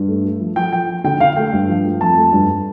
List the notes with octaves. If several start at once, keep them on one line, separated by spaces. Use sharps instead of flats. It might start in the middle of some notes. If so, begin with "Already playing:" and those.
Already playing: G2
A3
A3
F3
F3 G5
F3 G5
F3
D3 G5
D3 F5
A3 G5
G2
F3
A3
F2 A5
A3
G2